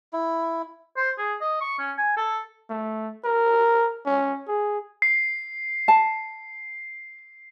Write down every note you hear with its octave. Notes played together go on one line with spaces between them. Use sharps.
E4
C5
G#4
D#5
C#6
C#4
G#5
A4
A3
A#4
C#4
G#4
C7
A5